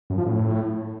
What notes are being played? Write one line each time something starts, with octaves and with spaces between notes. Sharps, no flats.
F#2
F3
A2